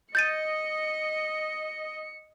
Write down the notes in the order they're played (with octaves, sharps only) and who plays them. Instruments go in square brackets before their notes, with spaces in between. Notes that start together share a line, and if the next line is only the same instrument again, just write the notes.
[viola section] D#5 [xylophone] G6 A6 D#7 [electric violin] C#7